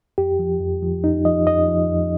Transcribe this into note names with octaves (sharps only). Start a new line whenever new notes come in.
F2 G4
F3
F2
F3
F2 D#4
F3 D#5
F2 D#5
F3
F2